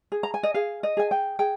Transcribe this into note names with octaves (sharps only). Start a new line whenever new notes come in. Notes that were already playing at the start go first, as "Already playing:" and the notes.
G#4
A#5
G#5
D#5
G#4 F5
D#5
G#4 G#5
G5
G#4 G5